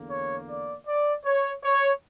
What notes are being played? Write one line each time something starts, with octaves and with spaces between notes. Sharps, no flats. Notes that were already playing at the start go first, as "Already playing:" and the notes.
Already playing: E2 D3 A#3
C#5
D5
D5
C#5
C#5